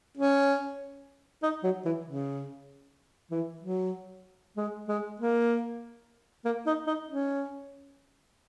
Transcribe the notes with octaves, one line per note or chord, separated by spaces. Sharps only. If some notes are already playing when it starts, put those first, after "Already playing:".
C#4
D#4
F#3
E3
C#3
E3
F#3
G#3
G#3
A#3
A#3
D#4
D#4
C#4